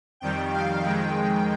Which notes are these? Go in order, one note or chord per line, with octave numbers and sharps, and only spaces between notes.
F2 D#3 G3 G5
F5
F2 D#3 G#3 G5